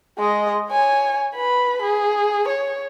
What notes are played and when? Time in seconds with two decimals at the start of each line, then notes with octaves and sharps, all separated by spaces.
0.19 G#3 D#5
0.70 C#5 G#5
1.35 B4 B5
1.82 G#4
2.48 C#5